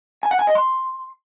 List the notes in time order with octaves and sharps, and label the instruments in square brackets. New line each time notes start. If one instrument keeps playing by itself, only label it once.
[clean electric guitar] G#5
F#5
G#5
D#5
C6